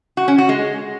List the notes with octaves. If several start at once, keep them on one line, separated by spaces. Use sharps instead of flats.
F#4
C#4
F#4
G#3